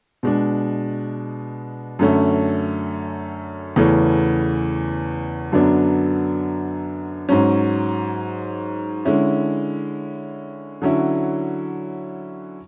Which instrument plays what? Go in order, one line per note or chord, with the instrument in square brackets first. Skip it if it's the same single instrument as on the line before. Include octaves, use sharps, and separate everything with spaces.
[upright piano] B2 G#3 D4
F#2 D3 A3 C#4
E2 C#3 E3 A3 C#4
F#2 D3 F#3 B3 D4
G#2 F#3 C#4
D3 G#3 C#4 E4
D3 F#3 C#4 E4